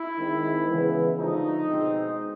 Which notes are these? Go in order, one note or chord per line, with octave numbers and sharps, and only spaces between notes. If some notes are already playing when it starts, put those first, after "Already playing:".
Already playing: E4
D#3 G#3 C4
C#3 E3 G#3 B3
D3 F3 A3 D#4
B2 G#3 C4